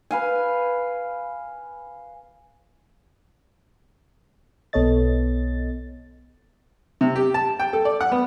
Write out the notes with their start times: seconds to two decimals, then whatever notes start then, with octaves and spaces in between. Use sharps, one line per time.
0.11 B4 F5 G#5
4.73 B1 B3 A4 C#5 D#5 A6
7.01 C3
7.16 G4
7.34 A5
7.59 G5
7.73 A4
7.85 D5
8.01 F#5
8.12 B3